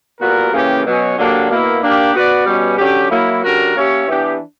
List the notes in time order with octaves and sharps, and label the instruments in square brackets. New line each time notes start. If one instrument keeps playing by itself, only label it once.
[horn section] A#2 G3 B3 F#4 A#4
C#3 E3 A#3 C#4 G4
B2 F#3 C#4
D3 F#3 A#3 D4 G4
B2 A#3 E4
A#3 D4 G4
B3 F#4 B4 D5
B2 G3 C#4
D3 F#3 C#4 G4
F#3 A#3 E4
D3 G3 C#4 F#4 A#4
A#3 C#4 G4 C#5 E5
E3 B3 D4 G4